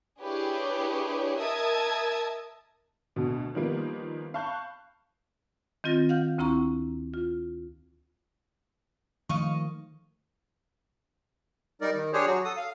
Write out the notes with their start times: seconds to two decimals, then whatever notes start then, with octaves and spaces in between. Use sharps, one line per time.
0.21 D4 E4 G4 G#4 B4 C#5
1.38 A#4 D#5 E5 A5 D#6 G#6
3.16 D2 B2
3.55 D#3 F3 G3 A#3 B3
4.34 F5 A5 B5 C#6 F#6 G6
5.84 D#3 C4 F4 A6 A#6
6.09 F5 F#5 F6 G6
6.38 D2 C4 E4 A#5 C#6
7.14 F4
9.29 D#3 F3 A3 D#5 F5 C#6
11.81 G3 D#4 A#4 D5
11.95 D#3
12.13 D4 G4 G#4 C5 C#5
12.27 F#3 F#4
12.45 A4 D#6
12.57 F5